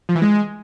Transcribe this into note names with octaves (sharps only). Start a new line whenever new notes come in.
F3
E3
G#3